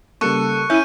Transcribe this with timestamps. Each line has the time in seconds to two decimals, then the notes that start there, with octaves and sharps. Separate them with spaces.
0.21 C#3 G3 A#3 A4 C#6 F#6 C#7
0.70 C#4 E4 E5 G6 D#7